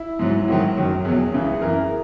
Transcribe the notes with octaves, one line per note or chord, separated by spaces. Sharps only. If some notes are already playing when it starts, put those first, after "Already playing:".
Already playing: E4
G#2 F#3
E4
G#2 D#3 F#3 F#4
F#2 D#3 F#3
E2 B2 F#3 G#4
C#2 C#3 E3
G#4
F#2 E3 A#4